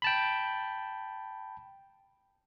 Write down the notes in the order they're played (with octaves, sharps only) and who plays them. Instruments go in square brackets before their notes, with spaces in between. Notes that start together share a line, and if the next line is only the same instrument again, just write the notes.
[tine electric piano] G5 A5 B5